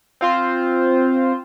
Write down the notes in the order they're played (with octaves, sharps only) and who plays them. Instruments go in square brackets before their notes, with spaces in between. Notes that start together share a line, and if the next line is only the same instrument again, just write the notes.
[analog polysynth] C4 F4 C5